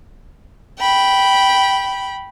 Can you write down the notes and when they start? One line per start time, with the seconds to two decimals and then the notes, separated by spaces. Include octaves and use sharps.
0.79 G5 B5